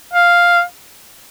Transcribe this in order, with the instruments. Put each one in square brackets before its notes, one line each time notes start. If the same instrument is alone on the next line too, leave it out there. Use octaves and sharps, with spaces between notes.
[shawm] F5